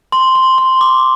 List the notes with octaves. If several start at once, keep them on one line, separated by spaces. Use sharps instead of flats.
C6
C6
C6
D6